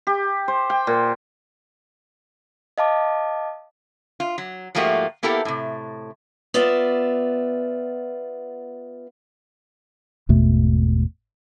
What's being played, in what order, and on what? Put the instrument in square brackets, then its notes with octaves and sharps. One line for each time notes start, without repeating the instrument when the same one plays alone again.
[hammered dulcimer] G4
C5
G5
A#2
[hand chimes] D#5 F5 A5 D6
[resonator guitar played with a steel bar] F4
F#3
G#2 F3 A3 A#3 F#4 G4
A#3 B3 E4 G4 A4 A#4
A2 C3
[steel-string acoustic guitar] B3 F4 D5 E5
[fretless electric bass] G#1 E2 B2 A3